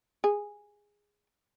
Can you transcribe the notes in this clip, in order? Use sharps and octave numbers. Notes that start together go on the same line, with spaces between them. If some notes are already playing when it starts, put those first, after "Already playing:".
G#4